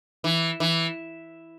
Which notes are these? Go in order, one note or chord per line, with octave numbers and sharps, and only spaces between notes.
E3
E3